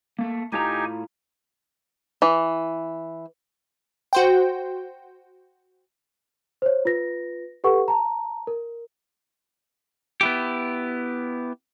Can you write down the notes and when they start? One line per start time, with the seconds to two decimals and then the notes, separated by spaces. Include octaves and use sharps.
0.19 A3 A#3
0.52 A2 D#4 F4 G4 G#5 A#5
2.22 E3
4.13 F#4 C5 G5
6.62 C5 C#5
6.85 F4 B4 A#6
7.64 G4 A4 B4 F#5 C#6
7.88 A5 A#5
8.47 A#4
10.21 B3 E4 G4